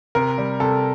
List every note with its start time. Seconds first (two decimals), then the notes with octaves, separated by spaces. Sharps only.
0.15 C3 A#4
0.38 G3
0.60 C3 A4